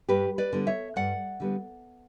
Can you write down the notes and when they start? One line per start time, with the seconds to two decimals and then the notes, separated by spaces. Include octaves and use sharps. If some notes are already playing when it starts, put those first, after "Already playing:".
0.09 G2 G4 B4
0.38 B4 D5
0.53 D3 G3 B3
0.67 C#5 E5
0.96 G2 D5 F#5
1.40 D3 G3 B3